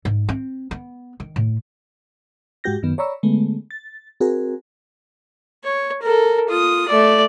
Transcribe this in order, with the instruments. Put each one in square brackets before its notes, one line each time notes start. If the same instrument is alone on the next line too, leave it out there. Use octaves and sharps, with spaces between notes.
[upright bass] G#2
C4
B3
D#3
A2
[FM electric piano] G#2 G#3 F#4 G4 G6 A#6
F#2 D#3 B3
C#5 D5 A#5 B5 C#6 E6
D3 G#3 A3 B3
A6
C4 F#4 G#4 A#4
[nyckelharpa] C#5
A4 A#4
F4 D#6
A3 D5